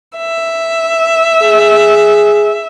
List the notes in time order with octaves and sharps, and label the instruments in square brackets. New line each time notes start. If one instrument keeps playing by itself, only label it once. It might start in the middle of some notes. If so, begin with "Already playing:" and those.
[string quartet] E5
[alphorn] G#4